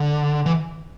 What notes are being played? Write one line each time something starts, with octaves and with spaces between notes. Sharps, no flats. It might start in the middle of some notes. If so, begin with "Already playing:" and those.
Already playing: D3
E3